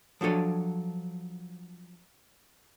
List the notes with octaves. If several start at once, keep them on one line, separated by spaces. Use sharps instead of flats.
F3 F#3 D4 A4 C#5